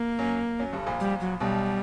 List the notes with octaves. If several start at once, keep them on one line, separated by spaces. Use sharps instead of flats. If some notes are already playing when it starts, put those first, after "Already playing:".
Already playing: A#3
F#2 F#3
F#2 F#3
G1 G2
A#1 A#2
G3
F#3
B1 B2 G3